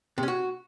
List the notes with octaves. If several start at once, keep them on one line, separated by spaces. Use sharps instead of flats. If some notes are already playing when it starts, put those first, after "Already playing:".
C3
C#4
F#4